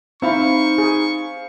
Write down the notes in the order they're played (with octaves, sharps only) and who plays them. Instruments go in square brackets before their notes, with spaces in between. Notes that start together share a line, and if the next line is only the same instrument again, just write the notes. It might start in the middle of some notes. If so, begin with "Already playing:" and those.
[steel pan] C4 E4 [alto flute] D#4 [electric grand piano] C5 F5 B5 [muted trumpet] C#6
[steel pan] G#4